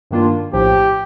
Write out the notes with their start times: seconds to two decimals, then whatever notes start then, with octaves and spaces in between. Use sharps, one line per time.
0.11 G2 D#3 A#3 D4 F4
0.53 A#1 A2 F3 G4